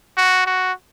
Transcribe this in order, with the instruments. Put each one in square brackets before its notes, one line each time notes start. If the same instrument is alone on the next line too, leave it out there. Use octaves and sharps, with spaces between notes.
[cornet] F#4
F#4